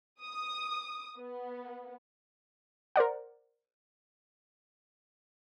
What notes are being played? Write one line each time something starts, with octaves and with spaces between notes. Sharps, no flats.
D#6
B3
A#4 C5 D5 F#5